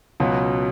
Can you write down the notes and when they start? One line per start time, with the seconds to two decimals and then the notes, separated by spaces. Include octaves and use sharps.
0.20 C#2 B2 F#3